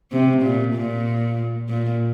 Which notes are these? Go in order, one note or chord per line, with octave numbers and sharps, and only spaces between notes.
C3
A#2
A#2
A#2